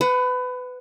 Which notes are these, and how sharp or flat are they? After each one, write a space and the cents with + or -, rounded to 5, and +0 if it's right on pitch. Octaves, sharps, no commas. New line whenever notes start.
B4 +25 F#5 +0